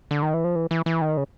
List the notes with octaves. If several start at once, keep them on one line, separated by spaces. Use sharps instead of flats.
D3
D#3
E3
F3
E3
E3
E3
D#3
C#3